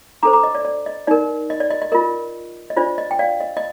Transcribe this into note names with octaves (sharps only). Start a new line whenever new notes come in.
D4 A4 C5 A#5 D6
A#5 D6
D#5
D5
D5
D#5
D#4 A#4 D5
D#5
D5
D#5
D#5
F4 A#4 D#5
D#5
D4 F4 C5 D5
D#5
G5
D5 F5
D#5
D#5